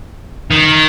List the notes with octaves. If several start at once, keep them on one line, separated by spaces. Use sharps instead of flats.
D#3